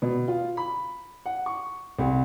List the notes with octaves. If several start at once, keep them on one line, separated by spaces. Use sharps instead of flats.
B2
F4
B5
F#5
C#6
C2